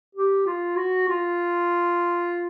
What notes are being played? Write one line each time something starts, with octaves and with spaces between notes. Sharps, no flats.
G4
F4
F#4
F4